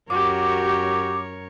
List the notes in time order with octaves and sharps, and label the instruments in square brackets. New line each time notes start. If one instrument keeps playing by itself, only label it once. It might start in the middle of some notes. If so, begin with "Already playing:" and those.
[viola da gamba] F#2 A#4 C#5 [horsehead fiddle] F#4 G4 [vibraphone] D6